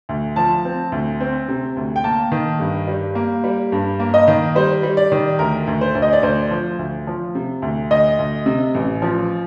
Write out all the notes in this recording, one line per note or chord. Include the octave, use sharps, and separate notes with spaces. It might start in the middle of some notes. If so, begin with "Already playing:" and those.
D2
F3 A5
C4
D2
C4
C3
D2
G5
A#3 A5
D#3
G2
G3
A#3
G3
G2
A#3
D#5
D#3
G3 C5
G3
D5
D#3
D2 A#4
D2
C5
D2
D#5
D5
D2 C5
F3
D2
F3
C3
D2
D2 D#5
D2
C3
A1
F3